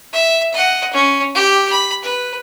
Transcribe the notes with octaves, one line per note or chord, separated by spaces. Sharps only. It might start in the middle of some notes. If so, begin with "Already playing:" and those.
E5
D#5 F#5
C#4
G4
B5
B4